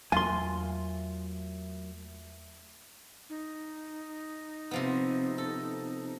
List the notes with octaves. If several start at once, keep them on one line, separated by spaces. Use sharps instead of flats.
E2 F#3 A3 A#3 F4 E5 G#5 C6
D#4
C3 F3 B3
A4